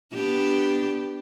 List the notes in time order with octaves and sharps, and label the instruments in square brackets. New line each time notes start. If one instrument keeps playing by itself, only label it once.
[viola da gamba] B3 D4 G4